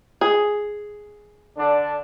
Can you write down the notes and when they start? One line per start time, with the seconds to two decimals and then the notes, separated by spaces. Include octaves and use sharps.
0.21 G#4
1.58 D3 D4